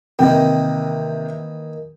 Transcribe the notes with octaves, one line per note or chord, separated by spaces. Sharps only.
C3 D#3 E3 A#3 G5